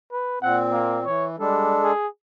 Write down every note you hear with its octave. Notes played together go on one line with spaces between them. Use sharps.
B4
A#2 C4 F#5
A#3
E3 C#5
G3 G#3 D4 A4
G#4